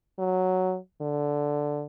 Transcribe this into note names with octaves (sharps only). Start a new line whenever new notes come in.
F#3
D3